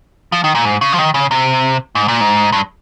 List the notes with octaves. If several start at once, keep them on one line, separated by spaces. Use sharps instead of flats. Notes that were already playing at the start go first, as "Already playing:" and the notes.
F3
D#3
A#2
G#2
C#3
F3
D#3
C#3
C3
G#2
A#2
G#2
G2